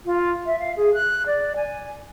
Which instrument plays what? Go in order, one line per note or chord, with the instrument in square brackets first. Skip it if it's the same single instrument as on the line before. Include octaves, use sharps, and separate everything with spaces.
[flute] F4
E5
F5
G#4
F#6
D5
G#5